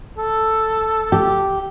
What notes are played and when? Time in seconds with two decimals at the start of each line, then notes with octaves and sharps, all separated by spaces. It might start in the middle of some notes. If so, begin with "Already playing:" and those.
0.18 A4
1.12 G4